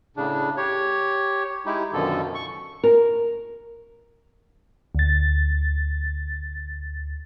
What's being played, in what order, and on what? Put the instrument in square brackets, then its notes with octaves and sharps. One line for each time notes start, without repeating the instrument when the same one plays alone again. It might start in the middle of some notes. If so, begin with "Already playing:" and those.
[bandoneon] A2 C#3 D4
G4 C#5
G#3 D#4 E4 G4
F#2 B2 D3 D#3 F3 A4
C#6
[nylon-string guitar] A#4
[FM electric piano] D2 A6